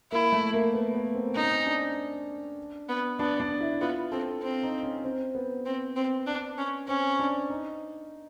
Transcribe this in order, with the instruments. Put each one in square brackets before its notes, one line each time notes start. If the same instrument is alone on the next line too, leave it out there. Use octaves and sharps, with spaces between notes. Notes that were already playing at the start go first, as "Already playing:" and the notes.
[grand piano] A#3 [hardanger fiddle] E4
[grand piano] A3
A#3
B3
B3
C4
[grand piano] C#4 [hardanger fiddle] D#4
[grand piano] C4
C#4
D4
[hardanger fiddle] B3
[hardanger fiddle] B3 [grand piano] D4
[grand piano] D4
E4
[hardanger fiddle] B3 [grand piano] F4
[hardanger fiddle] C4 [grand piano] A4
[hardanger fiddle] C4
[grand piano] D#4
C#4
C4
B3
[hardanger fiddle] C4
C4
D4
C#4
[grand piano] C4 [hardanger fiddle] C#4
[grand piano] D4
D#4